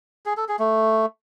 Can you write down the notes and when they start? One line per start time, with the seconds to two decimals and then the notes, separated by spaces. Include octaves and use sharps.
0.26 G#4
0.37 A4
0.49 G#4
0.59 A3